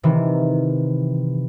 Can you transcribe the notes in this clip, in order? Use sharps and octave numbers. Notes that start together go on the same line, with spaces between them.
C3 D#3 E3